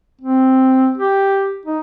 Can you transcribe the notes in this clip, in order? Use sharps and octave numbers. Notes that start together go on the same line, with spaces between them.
C4
G4
D#4